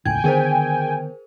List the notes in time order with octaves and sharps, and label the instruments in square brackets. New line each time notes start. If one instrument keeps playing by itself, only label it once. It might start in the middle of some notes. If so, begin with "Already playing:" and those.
[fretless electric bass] E1 C#2 A2 [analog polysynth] G5 G#5 [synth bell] G#6
[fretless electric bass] D3 D#3 B3 [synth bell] G#4 A#4 C5